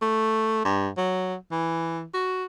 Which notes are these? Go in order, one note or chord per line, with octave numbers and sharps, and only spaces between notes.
A3
G2
F#3
E3
F#4